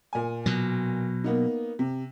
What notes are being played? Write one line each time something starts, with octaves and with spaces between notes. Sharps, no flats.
A#2 G#5
B2 F#3
A#3 B3 D#4
C3